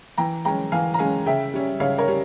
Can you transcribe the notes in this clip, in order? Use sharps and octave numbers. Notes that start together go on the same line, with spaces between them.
E3 G5 A#5
G#3 C#4 G5 A#5
E3 F5 G#5
A#5
G#3 C#4 F5 G#5
C#3 E5 G5
G3 C#4
C#3 C#5 F5
A#4 C#5
G3 C#4